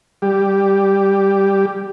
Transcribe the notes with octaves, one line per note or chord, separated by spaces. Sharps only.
G3 G4